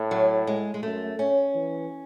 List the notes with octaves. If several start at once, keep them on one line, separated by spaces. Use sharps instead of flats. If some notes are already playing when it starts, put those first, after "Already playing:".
Already playing: A2
F#3
G#3
G#3
F#2 A3
C#4
E3